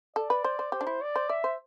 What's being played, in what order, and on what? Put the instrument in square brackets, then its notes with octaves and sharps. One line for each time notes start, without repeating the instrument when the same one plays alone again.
[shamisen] A4 [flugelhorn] D5
[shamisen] B4
C5
C5
[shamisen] G4 [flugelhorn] C5
[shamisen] D4
E4
[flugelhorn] D5
[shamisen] C5
[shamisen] D5 [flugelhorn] E5
[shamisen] C5